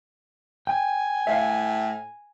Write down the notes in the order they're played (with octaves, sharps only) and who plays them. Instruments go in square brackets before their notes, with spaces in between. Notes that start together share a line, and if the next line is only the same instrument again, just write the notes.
[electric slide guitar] G5 [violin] G#5
[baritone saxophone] A2 [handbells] E5 F5